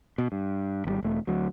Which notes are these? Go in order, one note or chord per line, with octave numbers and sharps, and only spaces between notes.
B2
G2
G#1 D#3 G3
E1 A3
D2 F#3